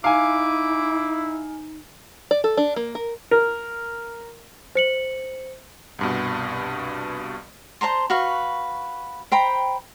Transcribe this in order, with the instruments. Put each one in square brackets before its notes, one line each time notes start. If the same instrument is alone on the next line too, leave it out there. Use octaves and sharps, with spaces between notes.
[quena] D#4 [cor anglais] E4 [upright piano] F5 G#5 [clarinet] D6
[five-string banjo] D5
A4
D4
A#3
A#4
[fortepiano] A#4
[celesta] C5 C#7 F#7
[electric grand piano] C2 G2 B2
[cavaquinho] C5 A5 A#5 C6
F#4 B4 F5 C#6
C5 G5 A#5 B5